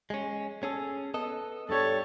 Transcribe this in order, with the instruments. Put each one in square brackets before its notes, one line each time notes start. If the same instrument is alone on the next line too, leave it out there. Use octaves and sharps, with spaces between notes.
[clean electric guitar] G#3 C#4
C#4 G#4 A4
B3 A4 D#5
[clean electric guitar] G2 G3 [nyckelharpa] A4 C#5